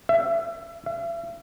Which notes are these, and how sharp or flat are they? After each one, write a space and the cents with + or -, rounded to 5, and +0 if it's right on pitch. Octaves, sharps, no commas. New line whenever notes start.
E5 +20
E5 +40